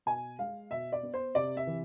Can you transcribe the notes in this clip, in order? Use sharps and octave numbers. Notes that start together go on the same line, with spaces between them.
B2 G#5
G#3 F5
B2 E5
D5
B3
C5
C3 D5
E5
E3